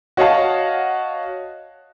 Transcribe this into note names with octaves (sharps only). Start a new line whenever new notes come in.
F#4 C#5 D#5 F5 F#5 A5